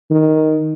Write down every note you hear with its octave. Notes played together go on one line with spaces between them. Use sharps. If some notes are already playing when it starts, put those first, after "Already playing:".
D#3